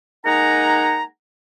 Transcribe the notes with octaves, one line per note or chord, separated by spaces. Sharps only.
G#3 A#3 D#4 F#5 G#5 A#5